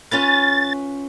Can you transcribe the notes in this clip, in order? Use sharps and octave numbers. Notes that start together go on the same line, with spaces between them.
C#4 F4 B4 A6